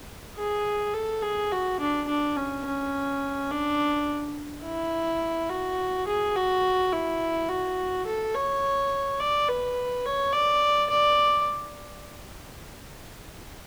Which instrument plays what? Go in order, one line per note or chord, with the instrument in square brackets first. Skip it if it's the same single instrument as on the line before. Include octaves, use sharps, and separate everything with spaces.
[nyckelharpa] G#4
A4
G#4
F#4
D4
D4
C#4
C#4
D4
E4
F#4
G#4
F#4
E4
F#4
A4
C#5
D5
B4
C#5
D5
D5